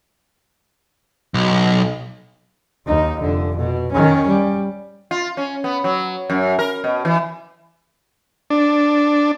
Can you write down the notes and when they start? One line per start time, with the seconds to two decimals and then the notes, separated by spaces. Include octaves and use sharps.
1.34 B1
2.86 D#2 D#4
3.20 F1 D3
3.57 B2
3.92 D#3 C#4
4.27 G3
5.11 F4
5.37 C#4
5.64 B3
5.84 F#3
6.30 F#2
6.59 A#4
6.84 B2
7.05 E3
8.50 D4